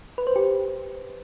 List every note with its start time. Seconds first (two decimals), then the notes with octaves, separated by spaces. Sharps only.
0.18 B4
0.27 C5
0.36 G4